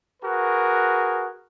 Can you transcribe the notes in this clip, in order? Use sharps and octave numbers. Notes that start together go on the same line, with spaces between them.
F#4 G#4 A#4 B4